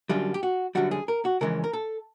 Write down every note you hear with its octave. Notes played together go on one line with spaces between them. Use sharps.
F#2 D3 G3 F4
G4
F#4
F#2 D3 G3 F#4
G#4
A#4
F#4
F2 C#3 E3 G#3 A#4
A#4
A4